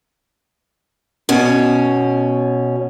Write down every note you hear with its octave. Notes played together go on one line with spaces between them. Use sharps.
B2 C#4